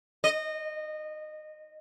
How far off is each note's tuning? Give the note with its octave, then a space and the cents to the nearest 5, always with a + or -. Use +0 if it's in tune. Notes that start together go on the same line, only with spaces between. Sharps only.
D#5 -20